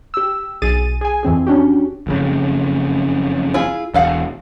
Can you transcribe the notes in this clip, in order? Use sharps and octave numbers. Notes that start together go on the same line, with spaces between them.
G4 E6
B1 G#4 A6 D#7
G#4 G#5
F2 E3 C4 G#4
C#4 D4 F#4 G4
F#1 F2 C#3
E4 F4 G#4
E1 A4 F5 F#5